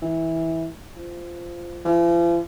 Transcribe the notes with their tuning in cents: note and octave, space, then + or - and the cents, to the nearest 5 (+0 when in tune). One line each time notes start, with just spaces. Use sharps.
E3 -15
F3 -15
F3 -45